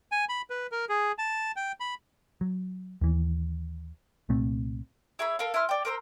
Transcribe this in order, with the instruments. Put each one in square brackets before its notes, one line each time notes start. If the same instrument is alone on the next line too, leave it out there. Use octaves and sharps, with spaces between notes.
[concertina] G#5
B5
B4
A#4
G#4
A5
G5
B5
[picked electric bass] F#3
D#2 E3
C2 A#2 A3 C4
[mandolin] E4 G#4 C#5 B5
A4 A#4 F5
E4 B4 C6 F6
D5 G5
A#4 C5 A#5 E6